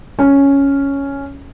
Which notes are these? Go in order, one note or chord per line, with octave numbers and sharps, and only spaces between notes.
C#4